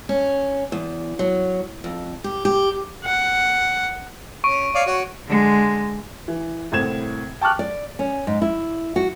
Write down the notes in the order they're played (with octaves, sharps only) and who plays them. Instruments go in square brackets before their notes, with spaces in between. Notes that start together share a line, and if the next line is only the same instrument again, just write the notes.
[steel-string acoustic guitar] C#4
E2
F#3
F2
G4
G4
[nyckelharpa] F#5
[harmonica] C#4 [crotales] C#6 D7
[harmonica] C#5 D5 F5
F#4 C#5
[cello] D3 G#3
[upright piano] E3
C2 A2 C4 G#6 E7
G5 A5 C#6 D6 F6 F#6
[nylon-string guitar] D5
C#4
G#2
E4
F#4